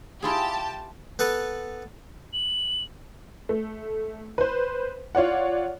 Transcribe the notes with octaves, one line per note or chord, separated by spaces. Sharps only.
E4 F4 G4 G#4 A5
B3 A4 B4
F#7
A3
B4 C5
F4 C#5 D5 F#5